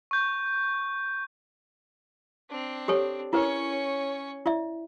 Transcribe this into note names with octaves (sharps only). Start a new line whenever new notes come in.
C#6 G6
C4 D4
G4 A4 C#5
C#4 E4 A#4 B4 C#5
E4 D5 E5